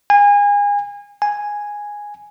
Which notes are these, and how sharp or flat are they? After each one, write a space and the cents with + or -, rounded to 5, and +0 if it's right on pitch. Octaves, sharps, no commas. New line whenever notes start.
G#5 -30
G#5 -5